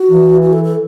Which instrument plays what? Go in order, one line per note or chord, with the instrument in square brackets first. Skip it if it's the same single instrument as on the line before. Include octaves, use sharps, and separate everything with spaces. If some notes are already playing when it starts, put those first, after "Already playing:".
Already playing: [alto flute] F#4
[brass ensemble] E3
[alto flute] F#4
A4
A4